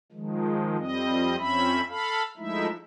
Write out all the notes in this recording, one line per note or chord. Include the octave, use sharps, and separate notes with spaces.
D#3 F3 G#3
F2 G3 C4 D#5
F2 C4 C#4 E5 B5
A4 F5 B5
F3 G#3 A3 D#4 E4 E5